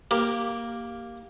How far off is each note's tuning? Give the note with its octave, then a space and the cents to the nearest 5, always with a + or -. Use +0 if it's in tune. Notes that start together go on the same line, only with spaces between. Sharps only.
A#3 +0 G4 +0 A#4 +0